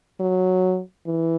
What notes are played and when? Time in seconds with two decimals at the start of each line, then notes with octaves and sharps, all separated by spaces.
0.20 F#3
1.07 E3